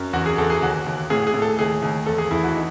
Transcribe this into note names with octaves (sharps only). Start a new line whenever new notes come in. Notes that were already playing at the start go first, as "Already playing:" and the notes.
Already playing: F#2
E2 F#4
G#4
E2 A4
G#4
D#2 F#4
D#2
A2 G#4
G#4
A2
A4
D#2 G#4
D#2
E2 A4
G#4
E2 E4
F#4
D#4